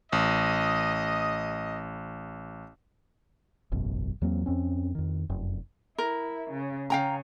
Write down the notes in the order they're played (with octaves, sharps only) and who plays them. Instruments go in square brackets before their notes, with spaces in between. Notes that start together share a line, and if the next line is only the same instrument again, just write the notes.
[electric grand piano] A1 [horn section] D#5
[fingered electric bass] E1 A1 F#2 B2
E2 F#3 A#3 C4
F2 C4 C#4
F2 D#3
F1 F#2
[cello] E4 [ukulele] A#4
[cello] C#3
[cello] C#3 [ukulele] F5 G5 A#5